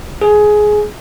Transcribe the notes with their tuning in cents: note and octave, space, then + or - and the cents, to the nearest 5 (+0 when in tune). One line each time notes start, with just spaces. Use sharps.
G#4 +15